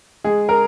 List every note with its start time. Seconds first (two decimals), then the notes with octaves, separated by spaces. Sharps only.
0.24 G#3 G#4
0.49 A#4